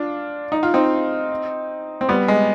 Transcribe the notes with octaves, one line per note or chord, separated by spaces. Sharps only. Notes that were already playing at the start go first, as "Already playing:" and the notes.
Already playing: D4 F4
D#4
F4
C4 D#4
C4
G3 B3
G#3